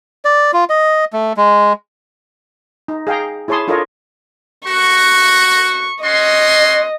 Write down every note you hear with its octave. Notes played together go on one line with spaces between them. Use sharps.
D5
F4
D#5
A3
G#3
D#4
G#4 F5 G5 A#5
E4 G#4 C#5 A5 C6 D#6
D4 F4 A4 A#4 C#5 D#5
F#4 C#6
C#4 F#4 D#5 C6